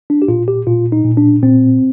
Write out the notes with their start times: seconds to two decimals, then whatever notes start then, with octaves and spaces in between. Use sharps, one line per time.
0.10 D4
0.22 G4
0.28 A#2 F4
0.48 G4
0.67 A#2 F4
0.92 D#4
1.05 A#2
1.17 D4
1.42 A#2 C4